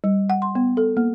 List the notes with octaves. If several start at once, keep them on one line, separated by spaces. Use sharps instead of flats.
G3
F#5
C6
B3
A4
A#3